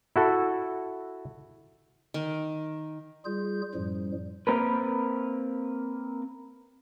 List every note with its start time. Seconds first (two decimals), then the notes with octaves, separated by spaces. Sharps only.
0.16 E4 F#4 A4
2.14 D#3
3.25 G3 F4 G#4 G6
3.74 F#2 A2 F3 G3
4.47 A#3 C4 A#4 B4